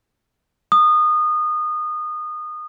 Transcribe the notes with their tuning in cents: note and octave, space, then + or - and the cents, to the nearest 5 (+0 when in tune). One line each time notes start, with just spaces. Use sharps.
D#6 -25